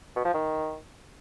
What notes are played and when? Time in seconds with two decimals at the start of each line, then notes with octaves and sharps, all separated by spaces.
0.16 B2
0.25 F3
0.34 D#3